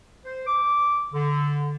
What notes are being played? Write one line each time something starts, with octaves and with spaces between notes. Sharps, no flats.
C5
D6
D3